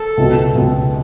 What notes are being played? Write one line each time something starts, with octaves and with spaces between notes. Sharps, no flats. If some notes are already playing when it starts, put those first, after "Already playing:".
Already playing: A4
C#2 B2 F#3
C#2 B2 F#3